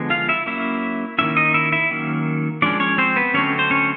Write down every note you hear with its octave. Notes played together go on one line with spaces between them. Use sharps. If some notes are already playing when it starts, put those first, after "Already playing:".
Already playing: D3 F3 G#3 B3
F4 F5
E4 E5
F#3 A#3 C#4 E4 E5
D#3 G3 A#3 C#4 E4 E5
D#4 D#5
E4 E5
E4 E5
D#3 F#3 A#3 C#4
F3 G#3 C#4 D4 D5
C#4 C#5
C4 C5
B3 B4
D3 F#3 A3 C4 C#4 C#5
C5
C#4 C#5